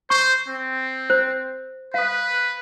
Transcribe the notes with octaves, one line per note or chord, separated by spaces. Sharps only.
C5 C#6
C4
C5
B4 F5 D#6